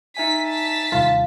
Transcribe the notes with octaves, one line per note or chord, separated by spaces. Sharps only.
D#4 E5 G#5 B6
A5 B6
D#2 C3 G3 F4